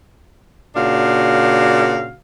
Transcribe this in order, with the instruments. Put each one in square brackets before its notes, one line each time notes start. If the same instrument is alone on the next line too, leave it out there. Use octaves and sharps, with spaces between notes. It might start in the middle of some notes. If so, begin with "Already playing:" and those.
[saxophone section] A#2 C#3 D4 F#4 F5